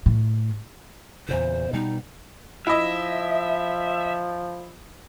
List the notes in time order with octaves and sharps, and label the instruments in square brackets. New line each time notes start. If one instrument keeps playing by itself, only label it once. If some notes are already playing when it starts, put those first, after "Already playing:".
[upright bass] A2
[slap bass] E2 A#2 C#3 [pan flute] C5
[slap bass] B2 G3 B3 [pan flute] D#4
[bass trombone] F3 [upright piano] E4 D#5 [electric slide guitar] E5